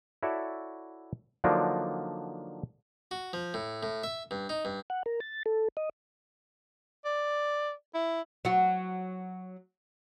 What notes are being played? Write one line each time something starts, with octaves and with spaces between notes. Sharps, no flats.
E4 F#4 A4 C#5 D5 E5
D3 F3 F#3 A#3 D4 D#4
F#4
F3
A2
A2
E5
G2
D#4
G2
F#5
A#4
A6
A4
D#5
D5
E4
F#3 F#4